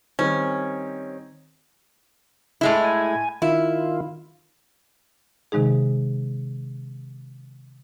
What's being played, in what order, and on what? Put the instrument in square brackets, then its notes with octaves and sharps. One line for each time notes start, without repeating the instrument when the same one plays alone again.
[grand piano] D#3 G3 C4 [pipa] C#4
[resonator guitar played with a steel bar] A2 G#3 E4
[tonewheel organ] G#5
[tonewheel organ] D#3 F4 [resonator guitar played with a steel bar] E4
[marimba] C3 D#3 G#3 D#4 G#4